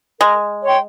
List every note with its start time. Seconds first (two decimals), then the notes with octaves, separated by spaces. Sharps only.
0.20 G#3 A#4
0.62 C#5 G5 C6